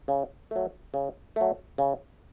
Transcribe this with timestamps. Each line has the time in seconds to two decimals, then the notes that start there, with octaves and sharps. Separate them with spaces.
0.08 C#3
0.51 F#3 A3
0.94 C#3
1.36 F#3 A3
1.78 C#3